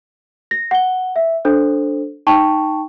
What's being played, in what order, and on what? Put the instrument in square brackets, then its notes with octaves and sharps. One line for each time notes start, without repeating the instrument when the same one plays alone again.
[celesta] A#6
F#5 G7
E5
D4 A4 C5
D#4 G5 A5 C#6